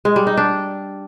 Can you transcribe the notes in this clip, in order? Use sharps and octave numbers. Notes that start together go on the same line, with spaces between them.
G#3
G3
D#4
D4